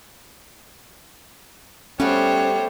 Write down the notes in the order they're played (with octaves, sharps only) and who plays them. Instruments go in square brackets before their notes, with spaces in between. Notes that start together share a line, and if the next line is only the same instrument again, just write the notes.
[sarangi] G3 [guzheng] A3 B3 F#4 [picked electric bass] C#4 [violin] C5 C#5